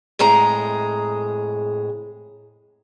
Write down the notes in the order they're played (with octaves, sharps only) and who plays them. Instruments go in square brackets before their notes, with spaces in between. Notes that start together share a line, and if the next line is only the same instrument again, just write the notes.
[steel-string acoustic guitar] F2 A2 G#3 G#4 A#5